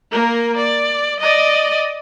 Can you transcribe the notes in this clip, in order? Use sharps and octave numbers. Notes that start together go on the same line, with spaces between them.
A#3 A#4
D5
D5 D#5